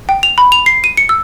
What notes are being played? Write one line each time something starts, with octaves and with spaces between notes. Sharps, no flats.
G5
F7
B5
F7
C7
D#7
C#7
E6